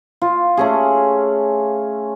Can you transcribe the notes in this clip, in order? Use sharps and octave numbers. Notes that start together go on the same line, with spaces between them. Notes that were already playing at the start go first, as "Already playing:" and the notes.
F4
A3 C#4 G#4